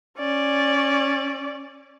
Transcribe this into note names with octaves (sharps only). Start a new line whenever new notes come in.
C#4 D5